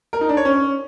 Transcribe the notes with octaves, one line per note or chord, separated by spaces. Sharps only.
A#4
D#4
D4
C#5
C#4